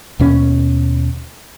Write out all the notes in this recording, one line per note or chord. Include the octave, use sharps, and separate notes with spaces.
D#2 B2 C#4